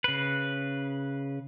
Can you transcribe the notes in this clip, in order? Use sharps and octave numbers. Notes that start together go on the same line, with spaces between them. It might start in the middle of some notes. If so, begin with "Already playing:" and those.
C#3 B4